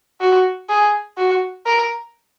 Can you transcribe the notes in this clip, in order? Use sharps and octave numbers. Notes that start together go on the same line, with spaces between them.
F#4
G#4
F#4
A#4